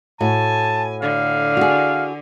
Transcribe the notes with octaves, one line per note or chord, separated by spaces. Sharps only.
A2 F#4 G#5 A5
D3 F5
F#4 G#4